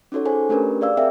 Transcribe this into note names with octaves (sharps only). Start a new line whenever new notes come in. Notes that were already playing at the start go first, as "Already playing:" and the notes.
C#4 D#4 F#4 A4 C#5
G#4 A4 C5 C#5 G#5
A3 C#4 D4 G4 A#4 B4
G#4 D5 F5 E6
C4 G#4 A#4 E5 G5